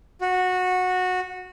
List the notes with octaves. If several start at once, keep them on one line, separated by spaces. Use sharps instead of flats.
F#4